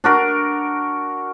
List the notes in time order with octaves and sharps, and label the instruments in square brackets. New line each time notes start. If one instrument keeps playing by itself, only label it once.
[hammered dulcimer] D4 F#4 A#4